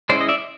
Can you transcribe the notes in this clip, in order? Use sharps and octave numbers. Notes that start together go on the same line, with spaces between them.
G#3 C#4 E4 C5 D5
D#5
D5 E5